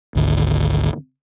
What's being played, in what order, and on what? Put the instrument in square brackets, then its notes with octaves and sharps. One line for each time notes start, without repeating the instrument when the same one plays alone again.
[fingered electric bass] G#1 D2